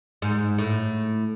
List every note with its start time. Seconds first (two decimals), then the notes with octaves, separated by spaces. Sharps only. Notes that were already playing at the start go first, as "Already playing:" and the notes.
0.22 G#2
0.58 A2